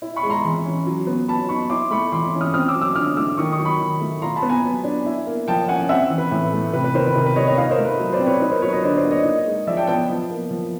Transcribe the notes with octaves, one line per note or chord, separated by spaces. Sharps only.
E4
B5 C#6
G#3
A#5 C6
E3
C#4
F#3
B3
F#3 A5 B5
D#4 B5 C#6
E4 C6 D6
A3 B5 C#6
E3 C6 D6
C#4
D#6 F6
C4 D#6 F6
D6 E6
F#3
D6 E6
D3 D#6 F6
A3 D6 E6
D#3 C#6 D#6
C#6 D#6
F#3
B5 C#6
D#3
A3
F4 A#5 C6
A5 B5
B3
G#5 A#5
F#3
D4
E4
A#3
F3 G5 A5
C#4 F#5 G#5
C4 E5 F#5
E3
B4
A2
A3
C3 B4
B4
D#3 A#4 C5
B4
C3 A#4
B4
G3 C#5 D#5
C#5 D#5
D#4 D#5 F5
A#4 C5
A3
B4
F#3
C5 D5
C4
B4 C#5
D#4 B4
A#4 C5
F#3 B4 C#5
C#5 D#5
D3 C5 D5
C5 D5
A#3
C#5 D#5
D#4
G#3
F3 D5 E5
G5 A5
B3 G5 A5
F3
A#3
F3